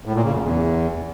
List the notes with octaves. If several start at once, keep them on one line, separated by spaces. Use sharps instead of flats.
A2
A#2
C#3
F#2
E2